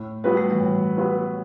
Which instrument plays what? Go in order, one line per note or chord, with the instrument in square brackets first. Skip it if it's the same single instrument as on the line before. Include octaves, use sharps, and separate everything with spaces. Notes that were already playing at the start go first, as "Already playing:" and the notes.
Already playing: [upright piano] A2
[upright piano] F#3 B3 F#4 B4 [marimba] G3
[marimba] A3
E3 G3
[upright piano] A2
F#3 B3 F#4 B4